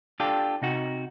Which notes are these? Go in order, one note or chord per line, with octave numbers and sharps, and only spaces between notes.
D4 F4 G4 A4
C3 D#4 F#4